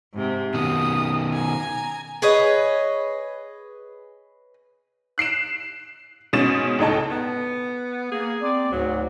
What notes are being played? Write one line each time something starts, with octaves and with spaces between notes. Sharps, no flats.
G#2 C3
B2 D#3 D#6
G#5 A#5
G#4 B4 C#5 D#5
F#6 C7 D7 E7
G#2 B2 C#4 A6 E7
C#2 A2 D#4 A5
B3
A#3 G#4
C4 D5
D2 G#2 F#3